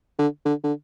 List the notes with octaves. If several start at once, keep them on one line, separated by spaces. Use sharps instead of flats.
D3
D3
D3